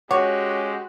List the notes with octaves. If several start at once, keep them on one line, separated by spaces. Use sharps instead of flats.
G#3 C#4 F#4 G4 C#5 F#5 D6